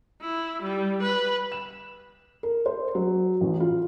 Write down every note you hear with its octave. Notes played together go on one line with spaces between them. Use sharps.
E4
G3
B4
E7
A#4
C5
F#3
A1
F4